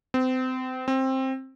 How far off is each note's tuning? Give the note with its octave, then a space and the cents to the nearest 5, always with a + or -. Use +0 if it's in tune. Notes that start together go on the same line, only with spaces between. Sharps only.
C4 -30
C4 +15